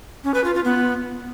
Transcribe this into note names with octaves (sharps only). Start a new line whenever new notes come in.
C#4
B4
F4
F4
B3